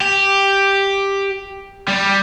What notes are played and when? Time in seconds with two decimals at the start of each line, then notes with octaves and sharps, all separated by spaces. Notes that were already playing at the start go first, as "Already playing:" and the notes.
0.01 G4
1.88 G3